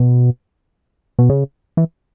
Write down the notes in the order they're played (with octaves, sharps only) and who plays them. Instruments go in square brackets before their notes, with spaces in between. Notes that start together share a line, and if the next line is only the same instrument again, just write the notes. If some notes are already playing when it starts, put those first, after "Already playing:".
Already playing: [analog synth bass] B2
B2
C#3
E3